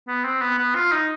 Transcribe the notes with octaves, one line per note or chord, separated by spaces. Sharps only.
B3
C4
B3
B3
F4
D#4